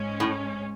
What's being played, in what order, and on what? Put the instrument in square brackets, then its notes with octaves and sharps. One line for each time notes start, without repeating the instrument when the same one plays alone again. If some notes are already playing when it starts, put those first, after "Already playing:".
Already playing: [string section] G#2 G#3 C#4
[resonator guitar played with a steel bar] A2